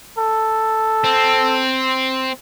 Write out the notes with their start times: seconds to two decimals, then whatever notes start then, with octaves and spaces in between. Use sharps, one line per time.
0.18 A4
1.04 C4